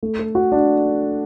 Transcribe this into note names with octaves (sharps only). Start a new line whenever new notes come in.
A3
A4
F#4
D4